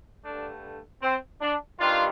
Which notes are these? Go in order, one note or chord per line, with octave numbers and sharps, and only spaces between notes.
G2 D3 A3 D4
C4
D4
G2 D#3 G3 D4 F4